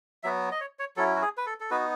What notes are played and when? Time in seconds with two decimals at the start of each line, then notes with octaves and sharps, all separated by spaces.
0.23 F#3 B3 F#4 E5
0.51 D#5
0.60 C#5
0.79 C#5
0.97 F#3 C#4 E4 A4
1.16 F#4
1.22 G#4
1.37 B4
1.46 A4
1.60 A4
1.71 B3 D#4 F#4 B4